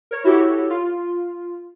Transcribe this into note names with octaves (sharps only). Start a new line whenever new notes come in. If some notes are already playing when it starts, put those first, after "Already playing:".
A#4 C#5
E4 F#4 G4 A4 C#5
F4